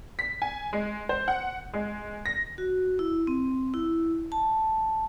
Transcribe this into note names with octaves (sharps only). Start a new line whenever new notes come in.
B6
G#5
G#3
C5
F#5
G#3
A#6
F#4
E4
C4
E4
A5